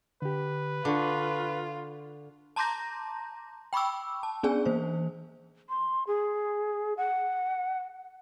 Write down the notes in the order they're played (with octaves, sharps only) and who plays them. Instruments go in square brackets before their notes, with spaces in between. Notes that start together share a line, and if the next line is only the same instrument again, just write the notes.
[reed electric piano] D3 G4 [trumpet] B4
[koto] D3 [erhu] F4 [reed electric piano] C#6 D6
[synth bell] A5 A#5 C6 D6 G6 A#6
G5 B5 C#6 D6 E6
A5
B3 C#4 D4 G#4 D5 G#5
E3 A#3 C5
[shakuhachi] C6
G#4
F#5